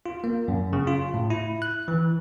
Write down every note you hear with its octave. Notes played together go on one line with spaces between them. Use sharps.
F4
A#3
F#2
C#3
F4
A2
E4
F#6
E3